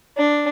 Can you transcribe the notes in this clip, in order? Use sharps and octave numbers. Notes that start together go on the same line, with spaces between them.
D4